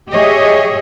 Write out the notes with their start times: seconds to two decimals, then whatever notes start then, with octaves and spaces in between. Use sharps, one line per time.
0.10 G4 G#4 C#5 D#5 E5